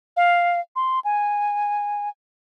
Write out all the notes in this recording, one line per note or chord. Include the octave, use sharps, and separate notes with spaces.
F5
C6
G#5